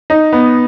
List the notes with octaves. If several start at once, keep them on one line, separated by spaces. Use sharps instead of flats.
D#4
B3